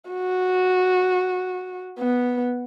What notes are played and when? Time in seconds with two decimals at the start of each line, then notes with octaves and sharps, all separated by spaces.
0.10 F#4
1.99 B3